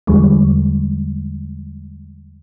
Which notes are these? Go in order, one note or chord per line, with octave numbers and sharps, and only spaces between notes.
E2 D3 F3 G3 G#3